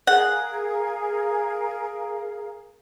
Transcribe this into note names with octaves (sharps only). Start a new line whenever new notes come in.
G#4 A#4 F5 F#5